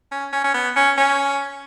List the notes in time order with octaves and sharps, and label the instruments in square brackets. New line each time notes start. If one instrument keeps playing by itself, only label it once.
[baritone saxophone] C#4
C#4
C#4
B3
C#4
C#4